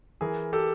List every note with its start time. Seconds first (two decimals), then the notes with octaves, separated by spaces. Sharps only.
0.21 E3 G#4 A#4
0.53 G4 A4